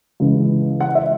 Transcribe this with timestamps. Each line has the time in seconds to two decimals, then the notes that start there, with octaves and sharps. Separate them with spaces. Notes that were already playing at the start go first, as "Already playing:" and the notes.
0.20 C#2 C#3 E3
0.81 F#5
0.95 E5